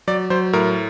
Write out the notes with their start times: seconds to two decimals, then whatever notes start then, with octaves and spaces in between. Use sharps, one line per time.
0.08 F#3 D5
0.30 F#3 C5
0.53 A2 A#4